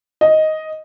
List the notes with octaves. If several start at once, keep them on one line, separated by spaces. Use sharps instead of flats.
D#5